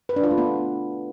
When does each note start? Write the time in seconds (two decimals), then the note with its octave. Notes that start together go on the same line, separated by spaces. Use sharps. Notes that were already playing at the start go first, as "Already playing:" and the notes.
0.09 B4
0.16 D4
0.24 F4
0.31 A3
0.38 B3